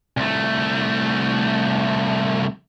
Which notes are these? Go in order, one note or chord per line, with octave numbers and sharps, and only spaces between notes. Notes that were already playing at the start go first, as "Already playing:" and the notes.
C2 A3